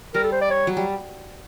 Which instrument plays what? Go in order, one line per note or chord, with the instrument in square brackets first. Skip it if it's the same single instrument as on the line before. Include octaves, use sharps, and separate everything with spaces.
[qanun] G3 [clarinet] A#4
[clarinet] A4
C5
D5
C#5
[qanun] F#3
G3